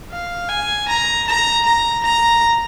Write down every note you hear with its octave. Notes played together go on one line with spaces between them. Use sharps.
F5
G#5
A#5
A#5
A#5
A#5